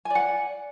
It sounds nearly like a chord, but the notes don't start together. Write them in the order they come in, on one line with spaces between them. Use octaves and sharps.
G#5 D5 F#5